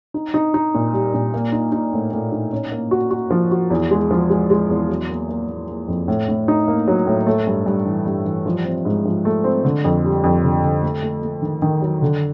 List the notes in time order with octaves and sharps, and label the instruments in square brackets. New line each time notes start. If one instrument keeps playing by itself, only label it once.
[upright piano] D#4
D#4
D#4
A#2
G3
A#2
A#3
D#4
D#4
A2
A2
D#4
C#4
A#3
F#4
F#4
F3
F#4
E2
G#3
F3
G#3
G#3
E2
F#3
A#3
A#3
A#3
A#3
F2
A2
A2
D#4
A#3
F#3
A2
A3
G2
G2
E3
G2
E3
F3
C4
G#2
F3
A3
C4
D3
F2
G3
F2
D3
D3
A3
A3
A3
D#3
D#3
F#3
D3